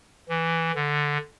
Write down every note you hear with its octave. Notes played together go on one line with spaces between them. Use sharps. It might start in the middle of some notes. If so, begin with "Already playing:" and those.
E3
D3